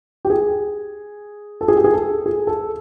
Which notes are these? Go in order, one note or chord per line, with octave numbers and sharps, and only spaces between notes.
G4
G#4
A4
G#4
G4
G#4
A4
G#4
A4